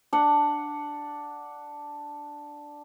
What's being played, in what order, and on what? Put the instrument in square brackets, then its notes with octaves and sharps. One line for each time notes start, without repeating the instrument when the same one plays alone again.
[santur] D4 F#5